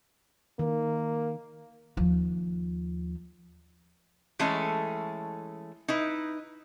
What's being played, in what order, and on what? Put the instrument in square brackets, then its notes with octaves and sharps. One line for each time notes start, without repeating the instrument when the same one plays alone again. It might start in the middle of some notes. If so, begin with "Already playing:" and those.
[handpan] D#3 [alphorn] A#3
[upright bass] D#2 F3
[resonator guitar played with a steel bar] E3 G#3 A3 C#4 A4
D#4 E4 B4